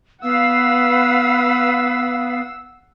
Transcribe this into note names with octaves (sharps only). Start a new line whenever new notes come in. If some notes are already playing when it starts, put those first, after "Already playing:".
B3 B4 F5 F#5 E6